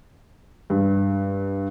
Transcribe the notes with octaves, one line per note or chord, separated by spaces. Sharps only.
G2